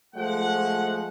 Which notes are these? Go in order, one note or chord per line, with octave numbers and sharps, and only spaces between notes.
F3 G#3 A3 F#5